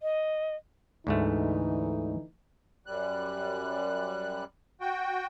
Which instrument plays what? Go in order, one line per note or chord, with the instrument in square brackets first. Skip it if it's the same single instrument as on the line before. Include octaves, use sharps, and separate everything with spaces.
[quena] D#5
[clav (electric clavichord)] D2 G#2 A3 [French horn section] D3 E3 D#4
[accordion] F#2 G3 F#6
F#4 G5